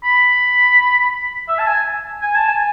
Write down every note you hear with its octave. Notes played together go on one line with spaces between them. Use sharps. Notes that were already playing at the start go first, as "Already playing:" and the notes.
B5
E5
A5
G#5
G#5
A5
G#5